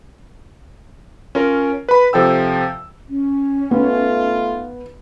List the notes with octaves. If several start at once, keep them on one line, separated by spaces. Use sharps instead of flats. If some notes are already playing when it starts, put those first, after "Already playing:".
C#4 F4 A#4
B4 B5
C3 F3 A4 G5 E6
C#4
A3 B3 D#4 F4